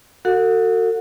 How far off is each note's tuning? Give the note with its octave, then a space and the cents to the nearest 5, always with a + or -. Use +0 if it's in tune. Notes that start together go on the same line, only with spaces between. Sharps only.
F#4 +0 A4 +40 F#5 -35